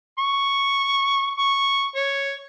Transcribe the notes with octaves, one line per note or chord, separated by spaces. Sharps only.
C#6
C#6
C#5